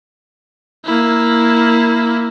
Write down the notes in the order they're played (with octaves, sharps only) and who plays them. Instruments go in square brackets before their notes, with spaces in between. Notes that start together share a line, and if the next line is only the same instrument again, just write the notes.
[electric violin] A#3 E4